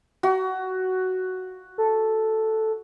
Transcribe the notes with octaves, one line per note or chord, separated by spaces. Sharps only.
F#4
A4